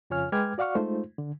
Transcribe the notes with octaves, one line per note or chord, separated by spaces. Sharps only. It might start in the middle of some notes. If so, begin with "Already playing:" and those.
F2 C#3 F4 C#5 G#5 F6
G#3 B4 G5 D6 F6 G#6
F#4 D5 F5 F#5 C#6 F6
G#3 A3 D#4 F4 C5
D3